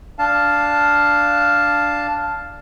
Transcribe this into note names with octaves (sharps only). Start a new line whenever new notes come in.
D4 F5 A5